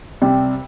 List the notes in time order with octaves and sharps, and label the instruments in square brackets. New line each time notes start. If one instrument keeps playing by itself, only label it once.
[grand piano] C3 G3 C4